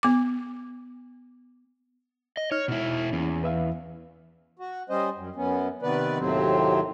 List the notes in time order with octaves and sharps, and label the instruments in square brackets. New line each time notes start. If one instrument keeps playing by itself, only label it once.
[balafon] B3 D6
[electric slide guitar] D#5
[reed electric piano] D#4 F6 [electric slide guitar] C#5
[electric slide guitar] B2 E4
[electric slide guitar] E2 [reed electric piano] A#3 C#4 E4
[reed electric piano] B4 E5 F5
[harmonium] F#4
G3 C#4 C5 D#5
F#2
F#2 B3 C#4
C3 D#3 B3 B4 D5
D#2 A2 C3 F#3 C4